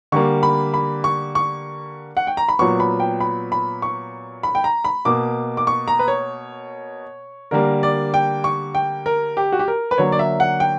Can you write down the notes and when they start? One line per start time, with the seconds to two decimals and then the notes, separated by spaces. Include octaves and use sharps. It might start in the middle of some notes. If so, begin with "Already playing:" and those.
0.12 D3 G3 A#3 C#6
0.43 B5
0.74 B5
1.04 C#6
1.35 C#6
2.17 F#5
2.27 G5
2.37 A#5
2.49 B5
2.59 A#2 F#3 B3 C#6
2.80 B5
3.00 G5
3.20 B5
3.52 B5
3.82 C#6
4.43 B5
4.55 G5
4.64 A#5
4.84 B5
5.05 B2 A#3 D6
5.57 D6
5.67 C#6
5.88 A#5
5.99 B4
6.08 C#5
7.51 D3 G3 A#3 A#4
7.83 D5
8.14 G5
8.44 C#6
8.75 G5
9.06 A#4
9.37 G4
9.52 F#4
9.59 G4
9.68 A#4
9.91 B4
9.98 D3 F#3 A#3 C#5
10.12 D5
10.19 E5
10.40 F#5
10.60 G5